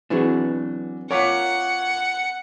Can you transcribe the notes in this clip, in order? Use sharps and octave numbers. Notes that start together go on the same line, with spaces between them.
E3 F#3 B3 C4 D4 F#4 G#4
F4 A#4 C#5 F#5 D6 B6